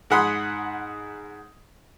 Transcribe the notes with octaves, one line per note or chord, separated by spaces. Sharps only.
G#2 G#4 F#5 B5 C6 D#6